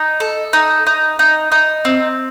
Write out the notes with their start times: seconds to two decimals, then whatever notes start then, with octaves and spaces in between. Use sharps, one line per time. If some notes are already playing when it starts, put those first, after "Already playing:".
Already playing: D#4
0.20 A4
0.53 D#4
0.87 D#4
1.19 D#4
1.52 D#4
1.85 C4